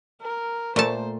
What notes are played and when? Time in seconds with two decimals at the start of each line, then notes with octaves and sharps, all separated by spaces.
0.21 A#4
0.76 A#2 A3 C5 A5